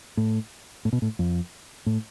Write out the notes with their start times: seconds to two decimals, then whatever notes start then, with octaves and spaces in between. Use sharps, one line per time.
0.17 A2
0.85 A2
0.93 B2
1.02 A2
1.19 F2
1.86 A2